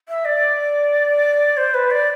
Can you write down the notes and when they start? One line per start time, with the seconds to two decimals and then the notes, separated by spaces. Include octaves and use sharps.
0.09 E5
0.25 D5
1.57 C5
1.74 B4
1.91 D5